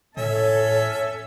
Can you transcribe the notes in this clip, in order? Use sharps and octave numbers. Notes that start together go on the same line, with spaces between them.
A2 C#4 A4 C#5 E5